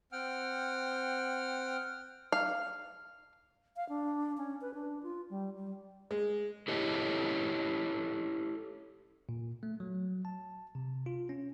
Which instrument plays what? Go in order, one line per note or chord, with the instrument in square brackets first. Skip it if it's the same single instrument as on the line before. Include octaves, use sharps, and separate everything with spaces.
[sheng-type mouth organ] C4 F#5 G5 F6
[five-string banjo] F5
[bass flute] F5
D4
C#4
B4
D4
F4
G3
G3
[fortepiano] G#3
[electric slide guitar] E4 G4 A4 C#5 D#5
[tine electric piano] A#2
A3
F#3
A5
C3
F4
C#4